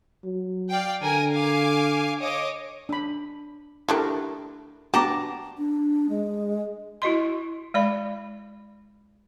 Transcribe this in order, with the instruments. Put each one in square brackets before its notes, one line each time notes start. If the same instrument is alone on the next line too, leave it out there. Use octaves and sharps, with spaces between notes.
[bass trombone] F#3
[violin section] D5 F5 G5
[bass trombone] D3 [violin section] A#4 G#5
[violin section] F5 G#5 D6
C#5 D#5 D6
[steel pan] D4 B5
[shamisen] D3 A3 D4 [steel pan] E4 G4 A#4
[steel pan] B3 D4 F#4 [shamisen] G4 [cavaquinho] A5 A#5 D6
[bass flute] D4
G#3
[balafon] E4 F#4 D#5 C6
G#3 D5 B5